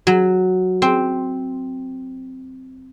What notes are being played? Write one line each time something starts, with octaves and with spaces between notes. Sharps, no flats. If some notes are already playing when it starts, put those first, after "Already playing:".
F#3
C4